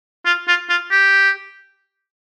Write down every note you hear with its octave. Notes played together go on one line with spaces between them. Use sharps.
F4
F4
F4
G4